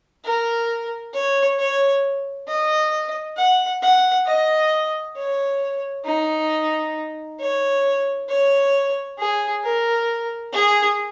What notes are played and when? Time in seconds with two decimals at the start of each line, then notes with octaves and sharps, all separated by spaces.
0.25 A#4
1.14 C#5
1.59 C#5
2.48 D#5
3.37 F#5
3.82 F#5
4.26 D#5
5.16 C#5
6.05 D#4
7.40 C#5
8.29 C#5
9.18 G#4
9.64 A#4
10.53 G#4